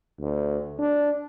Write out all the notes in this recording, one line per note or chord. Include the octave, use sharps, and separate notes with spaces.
D2
D4